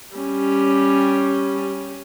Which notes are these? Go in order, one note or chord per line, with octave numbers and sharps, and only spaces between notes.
G3 C#4